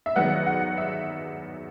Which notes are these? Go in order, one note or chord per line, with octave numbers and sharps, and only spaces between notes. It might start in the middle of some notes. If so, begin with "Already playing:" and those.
E5
E2 D#3 F#3 B3 F#5
F#5
E5